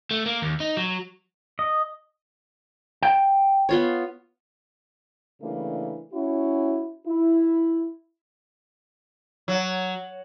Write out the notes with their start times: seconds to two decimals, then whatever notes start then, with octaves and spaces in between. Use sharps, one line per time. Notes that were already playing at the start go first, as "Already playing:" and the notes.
0.11 A3
0.26 A#3
0.42 D#2
0.60 D#4
0.77 F#3
1.59 D#5
3.02 G5
3.69 B3 F4 C#5
5.41 C#3 E3 G3 A3 A#3 D4
6.14 C#4 E4 F#4
7.06 E4
9.48 F#3